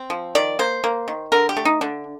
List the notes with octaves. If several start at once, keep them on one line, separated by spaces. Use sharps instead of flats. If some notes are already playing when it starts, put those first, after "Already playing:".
Already playing: C4
F3
D#3 D5
A#3 C5
A#3
D#3
D3 A#4
G4
A3
D#4
D3 D4